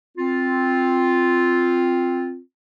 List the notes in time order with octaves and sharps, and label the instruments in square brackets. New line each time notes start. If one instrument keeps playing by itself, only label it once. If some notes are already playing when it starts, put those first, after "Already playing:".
[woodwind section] C4 F4